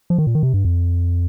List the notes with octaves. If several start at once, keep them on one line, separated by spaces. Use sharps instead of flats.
F3
D#3
A#2
D#3
C3
G2
F2